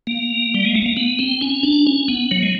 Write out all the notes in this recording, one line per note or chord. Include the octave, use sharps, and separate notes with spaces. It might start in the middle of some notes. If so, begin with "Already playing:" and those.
A#3
G3
G#3
A3
A#3
B3
C4
C#4
D4
C#4
B3
F#3
G#3